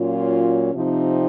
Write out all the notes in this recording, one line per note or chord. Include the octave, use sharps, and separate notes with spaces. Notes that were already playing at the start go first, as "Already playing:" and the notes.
Already playing: A#2 F#3 C#4 F4
C3 F3 C4 D#4